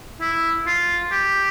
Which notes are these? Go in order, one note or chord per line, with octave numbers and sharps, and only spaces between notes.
E4
F4
G4